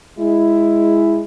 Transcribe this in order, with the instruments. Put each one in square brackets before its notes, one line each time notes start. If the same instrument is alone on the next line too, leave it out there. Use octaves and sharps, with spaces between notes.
[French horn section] G#3 E4